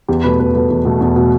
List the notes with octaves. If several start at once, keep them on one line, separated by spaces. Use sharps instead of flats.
E2 G4
B2 A3 B4
E2 B4
B2 A3 B4
E2
B2 A3
E2
B2 A3